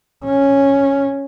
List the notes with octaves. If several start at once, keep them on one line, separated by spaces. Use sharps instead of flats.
C#4